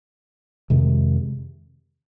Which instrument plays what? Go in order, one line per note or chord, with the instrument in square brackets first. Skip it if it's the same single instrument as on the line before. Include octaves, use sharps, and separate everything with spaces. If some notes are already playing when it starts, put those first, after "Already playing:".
[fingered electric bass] F2 C3 D#3 G#3